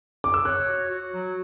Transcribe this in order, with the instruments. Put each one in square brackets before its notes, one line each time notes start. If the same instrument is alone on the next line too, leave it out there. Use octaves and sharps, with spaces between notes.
[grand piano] D6
E6
[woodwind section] C#5 [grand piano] F#6
[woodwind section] F#4
F#4
F#3